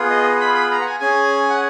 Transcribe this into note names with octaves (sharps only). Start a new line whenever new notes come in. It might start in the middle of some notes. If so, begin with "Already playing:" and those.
Already playing: B3 F4 G#4
D#5
B5
B5
A#5
F#5
G#5
C#4 G#4 G#5
F#5